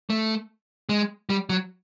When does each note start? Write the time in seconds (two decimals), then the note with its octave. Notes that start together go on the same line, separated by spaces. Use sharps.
0.10 A3
0.89 G#3
1.30 G3
1.50 F#3